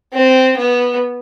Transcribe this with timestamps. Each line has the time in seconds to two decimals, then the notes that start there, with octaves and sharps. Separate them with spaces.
0.13 C4
0.56 B3